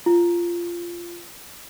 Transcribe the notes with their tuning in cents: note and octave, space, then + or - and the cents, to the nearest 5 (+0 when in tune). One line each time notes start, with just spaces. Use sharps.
F4 -15